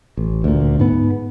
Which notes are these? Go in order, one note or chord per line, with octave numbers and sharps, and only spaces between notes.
A1
D2 A#2
G#2 B3